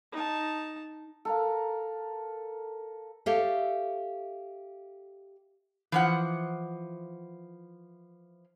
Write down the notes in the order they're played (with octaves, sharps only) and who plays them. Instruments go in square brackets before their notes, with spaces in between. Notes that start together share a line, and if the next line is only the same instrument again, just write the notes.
[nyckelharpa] D#4 A5
[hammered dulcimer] A4 A#4 F5
[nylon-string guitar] G4 A4 C#5 E5 F5
[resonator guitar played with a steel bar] E3 F3 F#5